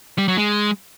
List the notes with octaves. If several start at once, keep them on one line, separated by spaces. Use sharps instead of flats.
G3
F#3
G#3